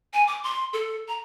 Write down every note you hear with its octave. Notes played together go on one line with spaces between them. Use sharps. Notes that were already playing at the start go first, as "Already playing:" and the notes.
G#5
D6
C6
A4
A#5